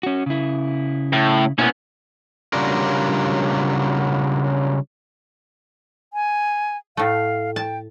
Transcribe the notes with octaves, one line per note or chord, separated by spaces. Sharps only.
C#4 F#4
C#3 E4
A2
B2 A#3 B3 C#4 E4
C#3 F#3 G3 D4 F4 A#4
G#5
A2 A3 F5
G5 A5